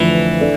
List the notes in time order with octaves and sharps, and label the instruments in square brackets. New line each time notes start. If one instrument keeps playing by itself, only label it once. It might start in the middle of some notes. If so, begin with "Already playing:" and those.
Already playing: [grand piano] F2 D3 F3 A3 [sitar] E3
[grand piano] D4 A4